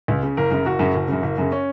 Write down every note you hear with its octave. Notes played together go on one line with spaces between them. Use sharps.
C#2
C#3
F#1 A#4
F#2 C#3
F#1 F#4
F#2 C#3
F#1
F#2 C#3
F#1
F#2 C#3
C#4